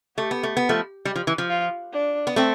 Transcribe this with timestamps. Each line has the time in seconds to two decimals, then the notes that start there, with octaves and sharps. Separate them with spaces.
0.17 A3 G4
0.31 B3
0.43 A3
0.57 B3
0.69 F3 A3
1.05 G3 G4
1.16 F3
1.27 E3
1.38 F3
1.49 F4
1.93 D4
2.27 B3
2.36 A3 C4